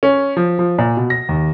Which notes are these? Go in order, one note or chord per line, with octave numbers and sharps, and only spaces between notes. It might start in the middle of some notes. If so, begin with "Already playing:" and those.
C#4
F3
F3
A#2
B2
A#6
D#2